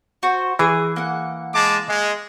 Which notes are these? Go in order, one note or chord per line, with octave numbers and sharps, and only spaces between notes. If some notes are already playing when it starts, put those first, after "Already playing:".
F#4 C5
E3 G#4
A#3 F#5
G#3 A5 D6
G#3